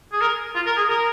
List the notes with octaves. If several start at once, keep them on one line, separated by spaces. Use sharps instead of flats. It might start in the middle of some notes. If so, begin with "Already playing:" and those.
G#4
A#4
F4
A#4
G#4
A#4